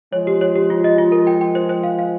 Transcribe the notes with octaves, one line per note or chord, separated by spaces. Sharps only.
F3 G#3 C#5
G4
C#5
G4
F4
D#5
F4
A#4
G5
G5
C5
C5
F5
F5